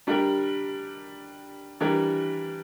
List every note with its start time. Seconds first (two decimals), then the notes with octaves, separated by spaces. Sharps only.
0.07 G3 D4 G4 A#4
1.80 E3 G3 D4 G4 A#4